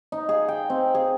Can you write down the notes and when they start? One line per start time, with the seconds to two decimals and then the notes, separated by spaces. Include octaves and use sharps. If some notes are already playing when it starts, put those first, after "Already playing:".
0.12 D#4
0.29 G#4
0.48 G5
0.70 C4
0.94 G#4